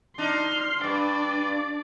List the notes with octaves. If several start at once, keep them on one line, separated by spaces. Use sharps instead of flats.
D4 D#4 C6 F6
G2 D4 D5